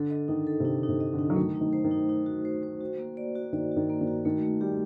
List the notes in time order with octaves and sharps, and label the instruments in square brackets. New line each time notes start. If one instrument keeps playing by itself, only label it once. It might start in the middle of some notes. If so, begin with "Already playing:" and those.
Already playing: [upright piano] D3 [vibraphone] A4
[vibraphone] D#5
[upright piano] D#3 [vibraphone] D#4
[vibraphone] A4
[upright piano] C3
[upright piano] D3 [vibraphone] D#4
[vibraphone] D#4
[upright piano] C3
[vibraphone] D#5
[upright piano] D3
[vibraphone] D#4
[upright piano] F#3
[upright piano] D#3 [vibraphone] A3
[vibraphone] D#4
[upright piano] D#3
[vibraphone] C5
[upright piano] D#3
[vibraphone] D#4
D#4
F#4
C5
C5
F#4
A#3
D5
F#4
[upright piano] D#3 [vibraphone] D5
[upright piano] D#3 [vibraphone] F#4
[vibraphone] A#3
[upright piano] D#3
[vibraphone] F#4
[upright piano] D#3 [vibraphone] A3
[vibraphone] A3
[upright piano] G3 [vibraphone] G4